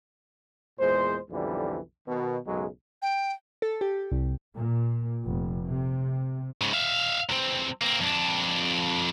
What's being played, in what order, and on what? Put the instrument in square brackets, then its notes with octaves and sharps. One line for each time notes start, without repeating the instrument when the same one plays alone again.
[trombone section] E2 A#2 G#3 C5
B1 F2 D3 E3 G3
B2 D#3
B1 F#2 C#3 F#3 G#3
[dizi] G5
[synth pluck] A4
G4
C2
[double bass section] A#2
F1
C3
[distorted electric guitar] G#2 C#3
E5 F5
E2 C4
A#3 C4
F2 D4